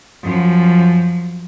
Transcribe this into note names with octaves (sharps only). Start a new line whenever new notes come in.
F#2 F3